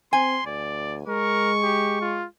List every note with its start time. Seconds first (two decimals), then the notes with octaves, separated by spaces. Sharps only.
0.13 C4 G#5 C6
0.46 D2 D5
1.07 G#3 A#4 C#6
1.63 G4
2.01 F4